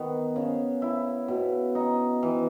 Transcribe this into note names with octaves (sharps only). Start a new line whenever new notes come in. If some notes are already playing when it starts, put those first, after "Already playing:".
Already playing: D#3 B3 D#4
C#3
E4
B2
D#4
E3